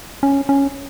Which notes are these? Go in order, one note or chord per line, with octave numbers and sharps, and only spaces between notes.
C#4
C#4